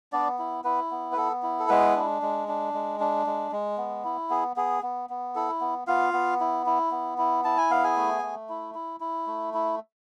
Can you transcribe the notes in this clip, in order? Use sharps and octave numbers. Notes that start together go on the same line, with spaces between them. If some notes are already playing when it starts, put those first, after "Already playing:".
B3 D4 D5
E4
B3 E4 B4
B3
B4
B3 A4
E4
A4
G#3 B3 B4
D4
G#3
D4
G#3
D4
G#3
G#3
B3
E4
B3 G#4
B3 G#4
B3
B3
E4 A4
B3
B3 F4 F5
B3
E4
E4
B3
E4
E4 A5
G#5
B3 F5
G#4 G#5
A3
A3
E4
E4
E4
A3
E4